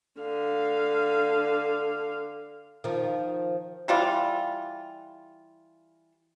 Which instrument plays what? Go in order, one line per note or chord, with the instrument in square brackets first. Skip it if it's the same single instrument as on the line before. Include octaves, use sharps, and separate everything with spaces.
[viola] D3 F5
[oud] D#3 F3
[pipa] E3 G3 F4